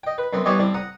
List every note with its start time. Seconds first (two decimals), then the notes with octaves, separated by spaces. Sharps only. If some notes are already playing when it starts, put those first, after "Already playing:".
0.03 D#5 G5
0.18 B4
0.33 F#2 B3 C4
0.45 E3 G3 B3 G4 C#5 D#5
0.58 A2 G3 C4
0.74 F#5 A#5 D#6